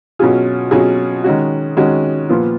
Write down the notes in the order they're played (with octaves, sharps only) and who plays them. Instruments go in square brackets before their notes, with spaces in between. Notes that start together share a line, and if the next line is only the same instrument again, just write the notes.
[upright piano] B2 F#3 C#4 F4 G#4
B2 F#3 C#4 F4 G#4
D#3 G#3 C#4 F#4
D#3 G#3 C#4 F#4
A#2 F3 B3 F4